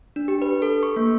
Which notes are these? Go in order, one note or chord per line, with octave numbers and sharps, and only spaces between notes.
D4
G4
B4
A4
C#6
A#3